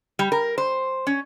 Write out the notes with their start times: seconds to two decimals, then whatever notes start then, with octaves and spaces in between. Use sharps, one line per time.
0.19 G3
0.32 A#4
0.58 C5
1.07 C#4